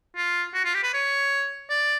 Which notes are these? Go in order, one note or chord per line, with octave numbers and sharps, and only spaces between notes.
F4
F#4
F4
G4
B4
C#5
D5